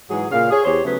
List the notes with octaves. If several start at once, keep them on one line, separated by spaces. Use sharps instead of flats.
G#2 E3 F#3 G#4
A#2 C#3 F5
G#4 C#5
E2 G4 C5 C#5
C#3 F#3 A3 B3 C#4 G#4